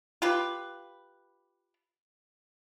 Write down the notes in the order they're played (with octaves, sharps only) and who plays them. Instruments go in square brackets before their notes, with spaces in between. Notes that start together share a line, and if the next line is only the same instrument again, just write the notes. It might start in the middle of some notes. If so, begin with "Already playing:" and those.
[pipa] F4 G4 B4